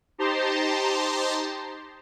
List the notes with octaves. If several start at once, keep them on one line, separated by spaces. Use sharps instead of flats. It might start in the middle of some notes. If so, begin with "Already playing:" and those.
D#4 G4 C5 A5 A#5 C6